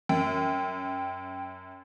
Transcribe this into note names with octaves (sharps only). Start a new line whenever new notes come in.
F#2 G5